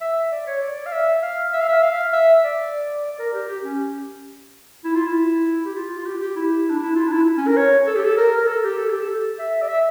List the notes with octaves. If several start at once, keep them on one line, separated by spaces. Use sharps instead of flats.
E5
D5
C#5
D5
F5
E5
F5
E5
F5
E5
F5
E5
D5
D5
A#4
G4
G4
C#4
E4
F4
E4
G4
F4
F4
G4
G4
E4
D4
E4
F4
D4
E4
C#4
A#4
C#5
A4
G4
A4
A#4
A#4
A4
G4
A4
G4
A4
E5
D5
E5